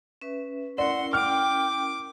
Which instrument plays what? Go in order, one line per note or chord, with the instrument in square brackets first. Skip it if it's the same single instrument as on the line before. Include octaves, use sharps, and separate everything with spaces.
[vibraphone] C#4 B4 E5
[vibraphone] C#4 E4 A#4 [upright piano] D5 [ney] F#5 [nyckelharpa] C6
[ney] G5 [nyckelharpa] D6 [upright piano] F6